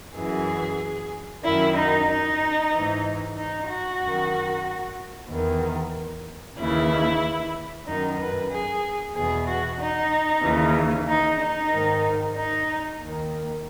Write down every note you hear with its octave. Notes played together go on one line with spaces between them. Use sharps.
F#2 E3 G#4
F#2 D#3 E4
D#4
D#4
G#2 E3
D#4
F#4
F#2 D#3
E2 D#3
D#2 C#3 E3 E4
F#2 D#3 D#4
B4
G#4
E2 B2 G#4
F#4
D#4
D#2 C#3 E3
D#4
D#4
G#2 D#3
D#4
D#2 D#3